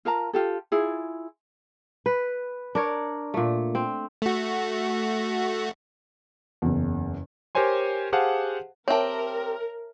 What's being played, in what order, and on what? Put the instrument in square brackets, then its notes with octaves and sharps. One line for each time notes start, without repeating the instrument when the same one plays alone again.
[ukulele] F4 A#4 A5 A#5
F4 G4 A4
E4 F4 G#4
[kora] B4
D4 A#4 C#5
A#2 A3
C4
[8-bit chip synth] A3 F#4
[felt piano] F#1 E2
[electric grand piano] G4 A#4 C5 C#5 G#5 C6
G4 G#4 C5 F5 F#5 A5
[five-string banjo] C4 G4 [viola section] A#4 [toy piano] C#5 E5 A5